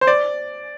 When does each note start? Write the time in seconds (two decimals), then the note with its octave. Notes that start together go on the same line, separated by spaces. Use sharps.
0.01 C5
0.07 D5